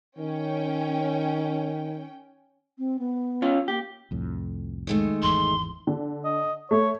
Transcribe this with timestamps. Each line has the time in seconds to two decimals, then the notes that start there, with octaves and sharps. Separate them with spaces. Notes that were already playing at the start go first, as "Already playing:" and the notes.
0.19 D#3 C#4 G5
2.78 C4
2.99 B3
3.42 C#4 F4
3.68 A#3 G4
4.11 C2 F2 A2
4.87 D#3 G#3 A3
5.23 G#1 E2 E3 C6
5.87 D3
6.25 D#5
6.71 A3 C#5